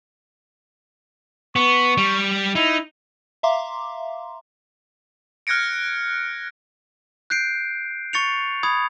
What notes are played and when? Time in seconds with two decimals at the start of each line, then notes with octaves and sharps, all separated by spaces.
1.56 B3 C#6
1.98 G3
2.55 D#4 E4
3.43 E5 F5 A#5 C6 D6
5.47 F6 F#6 G#6 A#6 C#7 D7
7.30 F#6 G6 C7 D7
8.13 C#6 A6 C#7 F7
8.63 B5 D#6 G#6